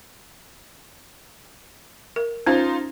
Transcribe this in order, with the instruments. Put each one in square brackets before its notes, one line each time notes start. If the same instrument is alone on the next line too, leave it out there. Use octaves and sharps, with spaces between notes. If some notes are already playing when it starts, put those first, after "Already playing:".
[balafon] A#4
[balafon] C#4 [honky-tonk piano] D#4 F4 C5